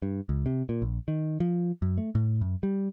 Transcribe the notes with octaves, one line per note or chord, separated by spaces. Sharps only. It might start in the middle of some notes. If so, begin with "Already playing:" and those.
G2
C#2
C3
A#2
A#1
D#3
F3
F#2
A3
A2
F#2
G3